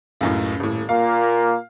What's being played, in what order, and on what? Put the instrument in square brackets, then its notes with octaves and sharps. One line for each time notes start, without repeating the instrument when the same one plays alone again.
[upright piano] C#2 F#2 A2
D#1 A2
[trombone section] A#2 A#3 [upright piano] F5